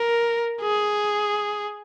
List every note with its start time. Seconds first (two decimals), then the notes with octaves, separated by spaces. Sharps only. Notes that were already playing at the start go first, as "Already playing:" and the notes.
Already playing: A#4
0.61 G#4